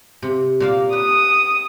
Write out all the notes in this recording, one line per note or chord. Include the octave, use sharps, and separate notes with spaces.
C3
A#2 A#3 F5
B4 D#6